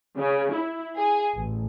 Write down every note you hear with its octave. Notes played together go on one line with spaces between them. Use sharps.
C#3
E4
G#4
A1